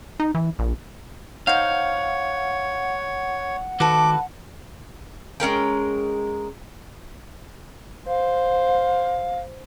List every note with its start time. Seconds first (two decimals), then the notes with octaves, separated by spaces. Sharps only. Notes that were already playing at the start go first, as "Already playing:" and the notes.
0.20 D#4
0.35 E3
0.59 A#1
1.47 D#4 C5 C#5 F5 F#5
3.80 D#3 F#4 A4 B4 D6
5.40 G#3 C#4 A#4 G5
8.07 C5 F5